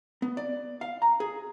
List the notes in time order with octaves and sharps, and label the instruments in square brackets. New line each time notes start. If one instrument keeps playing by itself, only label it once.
[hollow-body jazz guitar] B3
D5
F5
A#5
G#4